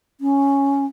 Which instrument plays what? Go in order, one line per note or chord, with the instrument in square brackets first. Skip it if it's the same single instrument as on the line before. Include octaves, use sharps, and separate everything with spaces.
[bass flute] C#4